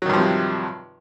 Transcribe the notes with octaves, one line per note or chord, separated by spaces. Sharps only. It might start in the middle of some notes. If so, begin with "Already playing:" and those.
G2 C3 D#3 F3 F#3